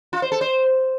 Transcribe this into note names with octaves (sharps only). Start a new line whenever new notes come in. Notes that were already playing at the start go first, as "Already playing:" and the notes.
F4
C5
A4
C5